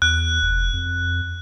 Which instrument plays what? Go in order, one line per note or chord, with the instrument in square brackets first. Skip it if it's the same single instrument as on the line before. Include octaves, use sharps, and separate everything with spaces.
[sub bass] E2 [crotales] F#6
[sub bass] F1
F2